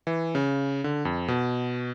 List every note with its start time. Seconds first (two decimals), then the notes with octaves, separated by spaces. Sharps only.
0.07 E3
0.35 C#3
0.84 D3
1.05 F2
1.28 B2